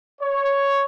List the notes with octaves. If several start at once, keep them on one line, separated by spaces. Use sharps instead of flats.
C#5